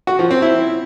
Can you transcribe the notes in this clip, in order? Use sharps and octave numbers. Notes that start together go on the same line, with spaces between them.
F#4
F3
C4
E4